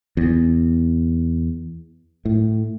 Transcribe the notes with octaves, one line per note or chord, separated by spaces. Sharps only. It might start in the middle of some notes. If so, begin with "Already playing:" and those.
E2
A2